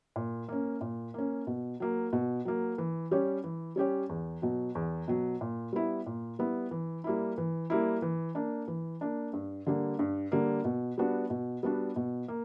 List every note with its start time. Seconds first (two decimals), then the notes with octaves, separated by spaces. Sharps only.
0.16 A#2
0.49 A#3 C#4
0.81 A#2
1.14 A#3 C#4
1.47 B2
1.80 F#3 A#3
2.13 B2
2.45 F#3 A#3
2.78 E3
3.11 G3 C#4 G4 C#5
3.44 E3
3.76 G3 C#4 G4 C#5
4.09 E2
4.42 B2 F#3
4.75 E2
5.08 B2 F#3
5.41 A#2
5.73 G3 B3 E4
6.06 A#2
6.39 G3 B3 E4
6.71 E3
7.04 G3 A#3 E4
7.38 E3
7.70 G3 A#3 E4
8.02 E3
8.35 A#3 D4
8.68 E3
9.01 A#3 D4
9.33 G2
9.66 D3 G3 A#3
9.99 G2
10.32 D3 G3 A#3
10.65 B2
10.98 G3 B3 D4 F#4
11.30 B2
11.63 G3 B3 D4 F#4
11.96 B2
12.28 A#3